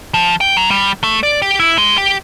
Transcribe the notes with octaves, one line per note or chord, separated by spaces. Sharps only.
F3
G5
F#3
G3
A3
D5
G4
E4
G#3
G4